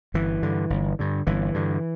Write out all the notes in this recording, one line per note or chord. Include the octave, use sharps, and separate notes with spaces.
G1 E3
G2 D3
G1
G2 D3
G1 E3
G2 D3